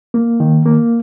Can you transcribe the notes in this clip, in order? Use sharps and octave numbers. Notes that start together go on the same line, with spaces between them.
A#3
D#3
A#3